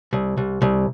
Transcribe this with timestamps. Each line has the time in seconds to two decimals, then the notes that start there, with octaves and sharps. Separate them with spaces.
0.13 C2
0.37 C2
0.62 C2